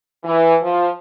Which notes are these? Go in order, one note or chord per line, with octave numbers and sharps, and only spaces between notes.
E3
F3